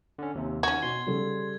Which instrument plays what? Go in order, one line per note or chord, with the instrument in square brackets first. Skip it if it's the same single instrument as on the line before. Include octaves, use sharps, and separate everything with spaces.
[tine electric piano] D3 C#4
D#2 C3
[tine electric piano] D#3 [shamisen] C#4 F#4 [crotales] G#6
[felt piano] B2 [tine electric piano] C6
[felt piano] C#3 G3 A4